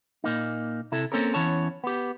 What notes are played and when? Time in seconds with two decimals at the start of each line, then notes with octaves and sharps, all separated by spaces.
0.24 A#2 A#3 D#4
0.92 C3 E4 A4
1.12 A#3 C4 C#4 A4 A#4
1.34 E2 E3 C#4 C#5 A5
1.84 B3 G4